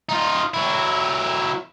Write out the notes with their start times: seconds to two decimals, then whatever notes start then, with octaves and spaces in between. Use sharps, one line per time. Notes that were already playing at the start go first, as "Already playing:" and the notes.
0.09 D#4 F4
0.54 F#3 E4